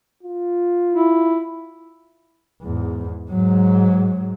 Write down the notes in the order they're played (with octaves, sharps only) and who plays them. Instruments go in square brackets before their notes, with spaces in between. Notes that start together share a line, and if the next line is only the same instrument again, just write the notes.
[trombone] F4
[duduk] E4
[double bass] E2 G#2
G#2 F#3